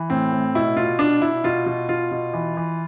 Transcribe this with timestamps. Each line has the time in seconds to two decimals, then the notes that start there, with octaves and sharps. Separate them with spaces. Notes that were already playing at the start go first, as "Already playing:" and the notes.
Already playing: E3
0.10 A2 C4
0.32 A2
0.55 B2 E4
0.76 B2 F4
0.99 B2 D4
1.21 B2 E4
1.44 B2 F4
1.66 B2
1.89 B2 F4
2.12 B2
2.33 E3
2.57 E3